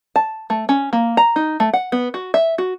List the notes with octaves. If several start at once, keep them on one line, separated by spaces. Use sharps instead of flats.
A5
A3
C#4
A#3
A#5
D#4
A3
F#5
B3
F#4
E5
F#4